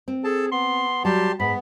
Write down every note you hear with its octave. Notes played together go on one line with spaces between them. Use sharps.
C4
G#4 A4 A5
B3 C6
F#3 G3 G4 A5 C6
G#2 B3 B5